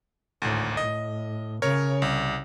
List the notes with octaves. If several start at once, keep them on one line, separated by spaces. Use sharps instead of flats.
G#1 D2 A2
A2 D#5
C#3 A#4 C#5
C2